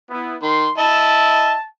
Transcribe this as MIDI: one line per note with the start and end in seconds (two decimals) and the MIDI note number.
0.10 0.36 59
0.10 0.36 64
0.43 0.67 51
0.43 0.71 84
0.78 1.54 64
0.78 1.54 75
0.78 1.54 76
0.78 1.66 81